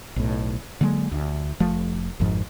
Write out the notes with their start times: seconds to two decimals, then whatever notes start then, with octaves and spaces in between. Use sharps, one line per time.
0.16 B1 A2
0.81 D3 F#3 G#3 A#3
1.11 D2
1.60 F1 F3 A3
2.20 G#1 F2 G#2 F3